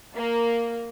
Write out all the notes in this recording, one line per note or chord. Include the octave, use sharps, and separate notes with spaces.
A#3